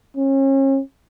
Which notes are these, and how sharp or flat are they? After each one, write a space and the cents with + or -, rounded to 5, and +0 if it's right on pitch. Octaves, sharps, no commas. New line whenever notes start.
C#4 -35